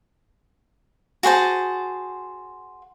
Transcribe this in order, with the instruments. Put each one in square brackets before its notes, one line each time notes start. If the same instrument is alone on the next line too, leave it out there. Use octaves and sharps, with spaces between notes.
[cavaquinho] F#4 G#4 C5 A5